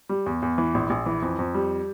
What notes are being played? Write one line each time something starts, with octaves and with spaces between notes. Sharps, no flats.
G3
E2
E2
E3
A#1
A#1
E3
F2
F2
G3